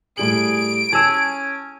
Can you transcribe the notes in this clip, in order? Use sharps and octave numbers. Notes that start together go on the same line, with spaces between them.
A2 G3 G#4 D7 F#7
C#4 G#4 A5 E6